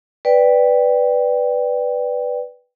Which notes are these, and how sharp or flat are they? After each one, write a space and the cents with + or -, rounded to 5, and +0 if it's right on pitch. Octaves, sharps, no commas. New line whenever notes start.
B4 +0 D5 +0 G5 +0